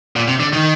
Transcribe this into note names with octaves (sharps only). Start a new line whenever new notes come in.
A#2
C3
D3
D#3